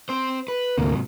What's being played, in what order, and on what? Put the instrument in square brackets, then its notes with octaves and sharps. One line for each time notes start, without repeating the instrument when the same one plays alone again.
[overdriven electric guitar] C4 C5
B4
[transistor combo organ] D2 A#3 [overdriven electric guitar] G#2 C3